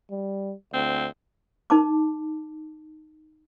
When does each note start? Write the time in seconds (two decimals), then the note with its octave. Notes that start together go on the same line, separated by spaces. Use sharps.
0.11 G3
0.74 D2 C4
1.70 D#4 A5 D6